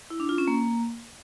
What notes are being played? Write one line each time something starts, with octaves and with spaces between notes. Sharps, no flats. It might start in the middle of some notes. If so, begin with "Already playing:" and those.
E4
D4
F4
C#4
A#3